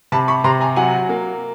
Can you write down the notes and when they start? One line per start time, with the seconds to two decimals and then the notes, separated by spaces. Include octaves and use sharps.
0.12 C3 A5 B5
0.28 B5 C#6
0.44 C3 A#5 C6
0.61 G#5 A#5
0.76 F#3 F#5 G#5
1.09 A#3